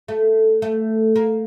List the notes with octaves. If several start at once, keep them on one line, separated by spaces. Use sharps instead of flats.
A3
A3
A#3